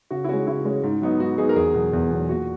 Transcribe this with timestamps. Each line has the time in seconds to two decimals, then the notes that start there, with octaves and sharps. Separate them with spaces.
0.10 C#3 F#4
0.24 E4
0.29 G#3 C#4 F#4
0.47 C#3 E4
0.65 G#3 C#4
0.83 G#2
1.02 F#3 B3 D#4
1.20 G#2 F#4
1.38 F#3 B3 D#4 G#4
1.49 A#4
1.56 E2 G#4
1.75 B2 F#3
1.93 E2
2.11 B2 F#3
2.29 A#2 F#4